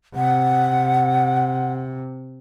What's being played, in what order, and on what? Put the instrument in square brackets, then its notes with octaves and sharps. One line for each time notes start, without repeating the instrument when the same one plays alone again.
[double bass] C3 [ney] F#5